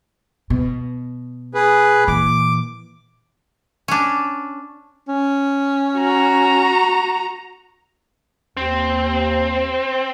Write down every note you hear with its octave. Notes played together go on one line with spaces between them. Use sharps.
B2
G#4 B4
A#2 E3 D6
C#4 D4
C#4
F#4 A#5
D#2 C4